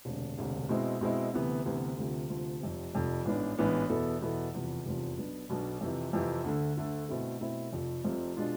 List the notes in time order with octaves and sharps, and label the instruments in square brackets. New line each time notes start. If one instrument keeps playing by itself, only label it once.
[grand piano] E1 D2 C3
E1 D2 C3
B2 G#3 C4 E4
B2 G#3 C4 E4
D2 C3 E3 B3
D2 C3 E3 B3
D2 C3 F3
D2 C3 F3
F1 F2 C3
F1 F2 C3
A1 G#2 E3 B3 D4
A1 G#2 E3 B3 D4
E2 B2 B3 E4 A4
E2 B2 B3 E4 A4
F1 E2 C3 F3
F1 E2 C3 F3
B1 B2 B3 D4
B1 B2 B3 D4
F2 C3 E3
F2 C3 E3
D2 D3 A3
D2 D3 A3
B2 A3 C4 E4 A4
B2 A3 C4 E4 A4
F1 F2 C3 F3
F1 F2 C3 F3
B2 G#3 D4 F4